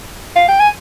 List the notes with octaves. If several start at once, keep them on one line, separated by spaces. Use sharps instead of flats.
F5
G5
G#5